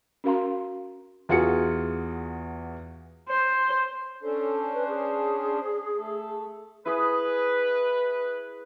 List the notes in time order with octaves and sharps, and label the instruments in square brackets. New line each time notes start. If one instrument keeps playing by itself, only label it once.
[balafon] C#4 F#4 A#4 F5 A#5 C6
[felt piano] E2 F4 F#4 G#4 C#7
[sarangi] C5
[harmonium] C#4 D4 C5 [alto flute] A4
[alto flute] B4
G#4
[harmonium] A3 A4
[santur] E4 G#4 D#6 [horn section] B4